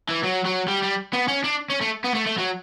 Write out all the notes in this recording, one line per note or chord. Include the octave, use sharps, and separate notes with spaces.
E3
F#3
F#3
G3
G3
B3
C#4
D4
C#4
A3
B3
A3
A3
F#3